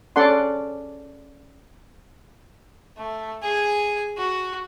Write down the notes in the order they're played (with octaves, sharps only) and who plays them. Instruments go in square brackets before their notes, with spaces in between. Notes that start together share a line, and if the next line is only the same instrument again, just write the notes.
[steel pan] C#4 A4 D5 F#5 C6
[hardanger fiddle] A3
G#4 G#5
F#4